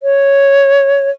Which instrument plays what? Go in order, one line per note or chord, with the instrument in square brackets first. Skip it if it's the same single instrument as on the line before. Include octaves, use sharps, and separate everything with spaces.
[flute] C#5